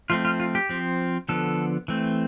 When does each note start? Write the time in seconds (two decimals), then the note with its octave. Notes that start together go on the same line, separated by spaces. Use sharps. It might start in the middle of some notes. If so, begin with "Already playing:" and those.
0.10 F3 A3 C4 F4
0.25 F4
0.40 F4
0.55 G4
0.69 F3 C4
1.29 D3 F3 B3 A4
1.88 E3 A3 C4